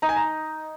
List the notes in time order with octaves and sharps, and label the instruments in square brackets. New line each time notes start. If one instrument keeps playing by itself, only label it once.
[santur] D#4 [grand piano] A#5
[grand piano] G#5
A#5